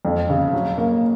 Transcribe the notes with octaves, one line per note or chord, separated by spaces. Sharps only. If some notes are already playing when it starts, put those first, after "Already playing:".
F2
C#3
F#3
A#3